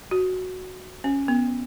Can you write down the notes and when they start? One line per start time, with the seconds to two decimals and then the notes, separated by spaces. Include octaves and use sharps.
0.11 F#4
1.04 C#4
1.28 B3